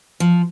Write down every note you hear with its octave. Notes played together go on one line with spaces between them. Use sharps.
F3